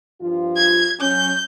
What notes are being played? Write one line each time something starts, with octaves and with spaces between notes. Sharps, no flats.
G2 F3 F4
G#6
F#3 C#4 G6